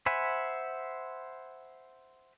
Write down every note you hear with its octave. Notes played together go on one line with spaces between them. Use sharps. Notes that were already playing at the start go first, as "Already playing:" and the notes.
C5 E5 F#5 G#5 B5